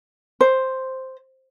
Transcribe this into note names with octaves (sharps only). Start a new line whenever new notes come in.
C5